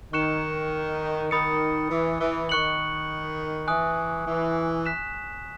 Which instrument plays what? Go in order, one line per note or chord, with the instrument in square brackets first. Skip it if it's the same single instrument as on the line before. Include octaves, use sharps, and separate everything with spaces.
[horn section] D#3 [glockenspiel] C#6 F#6 C#7 E7
[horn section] D#3 [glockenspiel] B5 D#6 A6 C#7
[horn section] E3
E3
[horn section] D#3 [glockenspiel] C#6 F#6 C#7 F#7
[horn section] E3 [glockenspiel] G#5 D#6 F#6
[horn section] E3
[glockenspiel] F#6 B6 E7